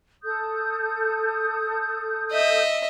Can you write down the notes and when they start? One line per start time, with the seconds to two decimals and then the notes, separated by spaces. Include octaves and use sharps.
0.23 A4 D#6 G6
2.31 D#5 E5